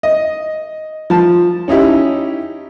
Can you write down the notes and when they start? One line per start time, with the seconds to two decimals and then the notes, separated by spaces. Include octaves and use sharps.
0.03 D#5
1.10 F3 A5
1.68 C#4 D#4 E4 G4